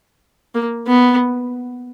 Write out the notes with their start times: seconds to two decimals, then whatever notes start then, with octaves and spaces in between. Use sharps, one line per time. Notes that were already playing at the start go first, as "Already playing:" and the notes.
0.55 A#3
0.87 B3